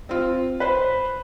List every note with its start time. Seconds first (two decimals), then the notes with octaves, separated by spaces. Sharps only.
0.09 C4 F4
0.60 B4 C5